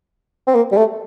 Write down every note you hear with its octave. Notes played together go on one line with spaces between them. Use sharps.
C4
A#3
G3
A3